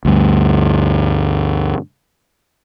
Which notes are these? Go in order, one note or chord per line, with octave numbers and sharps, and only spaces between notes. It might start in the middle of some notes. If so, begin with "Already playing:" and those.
D2 G2